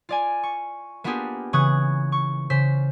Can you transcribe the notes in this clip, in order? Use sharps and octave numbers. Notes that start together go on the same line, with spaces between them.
F4 D5 G#5
C#6
A#3 B3 D4 F4 G4 G#4
C#3 E3 C#6 D#6 F#6 G#6
C#6
C#3 C5 B6